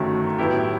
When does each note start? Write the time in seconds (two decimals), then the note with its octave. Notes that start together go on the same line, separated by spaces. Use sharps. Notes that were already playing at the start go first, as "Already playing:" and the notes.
Already playing: G1 F#2 D#3 F#3 A3
0.38 A2 F#3 B3 E4 G4